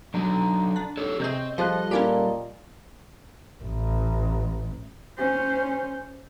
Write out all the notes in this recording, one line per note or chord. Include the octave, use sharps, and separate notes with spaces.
D3 F#3 D#4 F#4 A#5
D4
D#4 G4 A4 C#5
C3 C4 G#4 C5 C#5 D#5 G6
F3 G3 F4 G#4 A4 D#5 F#6
A#2 C#4 E4 G4
A1
C#4 C5